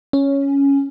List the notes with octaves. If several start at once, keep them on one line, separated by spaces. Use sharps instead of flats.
C#4